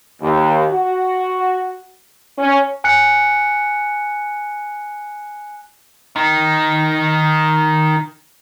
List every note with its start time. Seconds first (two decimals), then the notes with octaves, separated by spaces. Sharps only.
0.22 D#2
0.70 F#4
2.38 C#4
2.84 G#5 F#6 C#7
6.16 D#3 D#4